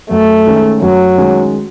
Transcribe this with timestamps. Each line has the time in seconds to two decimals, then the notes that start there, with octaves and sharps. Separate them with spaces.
0.10 F#2 A3
0.47 D#3 G#3 C#4
0.82 F#2 F#3
1.18 D#3 G#3 C#4